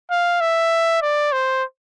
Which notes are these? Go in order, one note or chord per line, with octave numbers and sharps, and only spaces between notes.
F5
E5
D5
C5